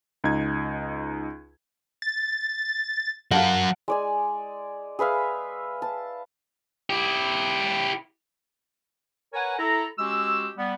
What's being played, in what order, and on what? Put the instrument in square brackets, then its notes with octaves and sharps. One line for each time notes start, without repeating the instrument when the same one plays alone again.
[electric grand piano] C#2 D#4 G#6
[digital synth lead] A6
[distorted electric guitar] F#3 A#4 [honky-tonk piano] F5 A5 F#7 [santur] F#5
[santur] G#3 D5 G#5
G#4 B4 E5 F5
A5
[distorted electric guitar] E4 G4
[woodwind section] A#4 B4 C#5 F#5 G#5
E4 A4 A#5
G#3 C#4 F#4 G4 E6
G3 B3